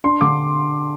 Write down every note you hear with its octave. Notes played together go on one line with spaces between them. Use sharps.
D4 C6
D3 D6